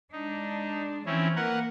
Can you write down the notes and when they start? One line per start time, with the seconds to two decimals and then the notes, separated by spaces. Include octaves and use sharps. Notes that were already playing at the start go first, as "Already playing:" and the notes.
0.12 G#3 D4 D#4
1.06 E3 F3 C4 C#4 E4
1.36 A#3 A#4 B4 F#5